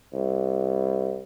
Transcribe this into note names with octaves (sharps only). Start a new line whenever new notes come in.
C2